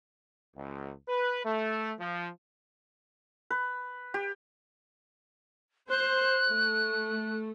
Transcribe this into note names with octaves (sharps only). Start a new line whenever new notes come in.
C#2
B4
A3
F3
B4
G4
C5 F#6
A3